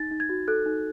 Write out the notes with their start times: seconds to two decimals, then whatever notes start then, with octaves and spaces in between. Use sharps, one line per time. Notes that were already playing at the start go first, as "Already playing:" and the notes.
Already playing: D#4 A6
0.11 D#4
0.20 G#6
0.29 F#4
0.48 A4 F#6
0.66 D#4